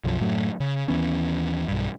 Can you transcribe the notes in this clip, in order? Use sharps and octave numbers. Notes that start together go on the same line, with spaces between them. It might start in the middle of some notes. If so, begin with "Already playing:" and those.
B1 F#2 F3
F#2 A2 F#3 A3
C#3
D#2 E3 B3 C#4
B1 G2